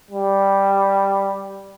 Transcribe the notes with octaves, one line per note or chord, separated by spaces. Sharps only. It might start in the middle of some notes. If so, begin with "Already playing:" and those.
G3